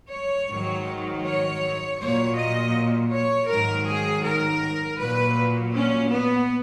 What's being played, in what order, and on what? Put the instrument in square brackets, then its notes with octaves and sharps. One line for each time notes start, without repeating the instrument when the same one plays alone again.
[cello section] C#5
G#2 D#3 F#3
C#5
A#2 F#3 C#5
D#5
C#5
G#2 D#3 F#3 A#4
G#4
A#4
A#2 F#3 B4
C#4
B3